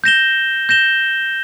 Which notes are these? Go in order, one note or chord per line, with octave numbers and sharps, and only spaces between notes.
G6 A#6 E7 G7
G6 A#6 E7 G7